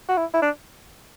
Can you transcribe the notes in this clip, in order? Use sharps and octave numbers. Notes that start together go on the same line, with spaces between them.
F#4
E4
E4
D4